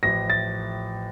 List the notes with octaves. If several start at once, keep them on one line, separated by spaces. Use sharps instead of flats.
A1 A2 F3 A#6
A6